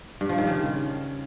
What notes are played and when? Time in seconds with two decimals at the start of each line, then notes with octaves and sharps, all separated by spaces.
0.21 G2
0.29 F3
0.38 D#3
0.46 C#3